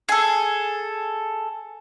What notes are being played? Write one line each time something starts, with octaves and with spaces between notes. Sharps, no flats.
G#4 A4